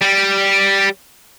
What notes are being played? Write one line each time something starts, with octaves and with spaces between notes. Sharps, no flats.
G3 G4